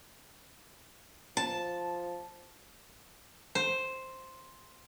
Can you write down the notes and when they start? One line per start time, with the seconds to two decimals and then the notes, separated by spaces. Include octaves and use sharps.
1.37 F3 A5
3.55 C5